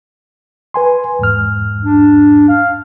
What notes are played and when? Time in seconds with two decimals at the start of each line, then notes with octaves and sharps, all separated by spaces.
0.74 B4 G#5 C6
1.19 E2 G#2 F6
1.84 D4
2.49 F5